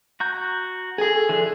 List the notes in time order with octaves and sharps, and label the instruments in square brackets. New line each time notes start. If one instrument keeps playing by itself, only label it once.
[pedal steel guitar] F#4 A#5 G6
[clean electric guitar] G#4 G#5 [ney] A4
[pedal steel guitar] E3 F3 D4